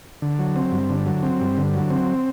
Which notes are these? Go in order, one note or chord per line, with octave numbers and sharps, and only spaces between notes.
D3
F#3
C4
G2
D3
F#3
C4
G2
D3
F#3
C4